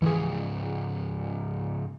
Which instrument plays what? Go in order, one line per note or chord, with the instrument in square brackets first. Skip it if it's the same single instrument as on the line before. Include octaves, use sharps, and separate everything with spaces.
[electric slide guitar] G#2 C#3 F3 [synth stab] E3 G#4